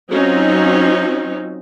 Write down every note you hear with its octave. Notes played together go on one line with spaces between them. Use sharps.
F#3 C4 C#4 D#4 F4